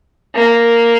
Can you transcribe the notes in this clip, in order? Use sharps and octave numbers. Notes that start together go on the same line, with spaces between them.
A#3